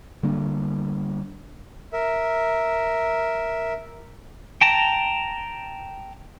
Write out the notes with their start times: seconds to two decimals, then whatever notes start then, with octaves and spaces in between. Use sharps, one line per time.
0.23 D3 G3 A#3 D4
1.92 A#4 E5
4.61 G5 A5 A#5